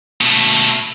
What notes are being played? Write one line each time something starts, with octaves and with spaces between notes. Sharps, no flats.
B2 A3